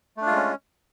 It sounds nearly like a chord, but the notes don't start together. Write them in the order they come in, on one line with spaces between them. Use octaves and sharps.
A3 D4 F4 G#3 C#4